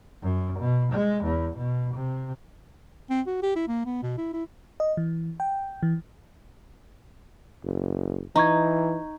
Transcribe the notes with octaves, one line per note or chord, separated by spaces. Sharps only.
F#2
B2
G#3
E2
B2
C3
C4
F#4
G4
E4
A#3
B3
B2
E4
E4
D#5
E3
G5
E3
F#1
E3 D#4 A#5 C#6 G#6